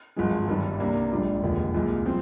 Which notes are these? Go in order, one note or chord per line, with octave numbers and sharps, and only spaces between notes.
G#1 G2 F3 G#3
G1 G2 D#3 G3
C2 C3 G3 A#3 D4
A#1 G#2 G3 D4
F1 D#2 D3 F3 G#3
C2 A#2 G#3
F3 C4